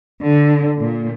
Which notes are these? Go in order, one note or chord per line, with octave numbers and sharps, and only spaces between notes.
D3
A#2